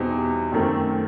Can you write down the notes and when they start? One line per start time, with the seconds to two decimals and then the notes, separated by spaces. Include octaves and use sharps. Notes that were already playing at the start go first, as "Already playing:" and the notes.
Already playing: E2 B2 G3 C4 D#4
0.52 F#2 D#3 A3 C4